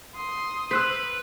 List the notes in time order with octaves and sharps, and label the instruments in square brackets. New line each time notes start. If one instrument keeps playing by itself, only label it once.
[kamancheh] C6 D#6
[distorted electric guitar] B4 [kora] C5 [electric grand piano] E6 F#6 B6